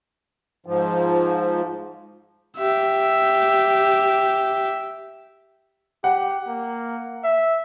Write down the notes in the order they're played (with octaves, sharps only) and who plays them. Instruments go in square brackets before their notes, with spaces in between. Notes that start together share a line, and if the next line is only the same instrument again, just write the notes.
[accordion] G#2 F3
[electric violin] G4 E5
[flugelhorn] G4 [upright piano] F#5
[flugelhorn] A#3
E5